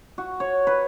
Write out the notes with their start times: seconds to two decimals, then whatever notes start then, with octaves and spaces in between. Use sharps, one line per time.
0.18 F#4
0.40 C#5
0.67 B4